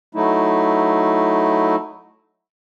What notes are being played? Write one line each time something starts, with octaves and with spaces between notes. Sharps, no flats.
F#3 A3 D#4 E4